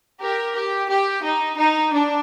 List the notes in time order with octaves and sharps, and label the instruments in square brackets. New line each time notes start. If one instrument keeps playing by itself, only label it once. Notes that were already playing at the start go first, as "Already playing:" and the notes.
[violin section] G4 A#4
G4
G4
D#4
D#4
D4